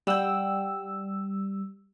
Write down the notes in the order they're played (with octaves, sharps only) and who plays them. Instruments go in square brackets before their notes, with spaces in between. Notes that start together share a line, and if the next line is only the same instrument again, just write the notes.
[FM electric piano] G3 E6 [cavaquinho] F#5 G5